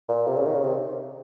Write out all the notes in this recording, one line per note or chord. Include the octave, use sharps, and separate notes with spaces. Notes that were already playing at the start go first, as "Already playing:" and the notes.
A#2
C3
C#3
D#3
C#3
C3